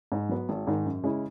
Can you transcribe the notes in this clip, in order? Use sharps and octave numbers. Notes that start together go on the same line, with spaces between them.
G#2
F#3 B3
G#1
G#2 D#3
F#2
C#3 G#3 C#4 E4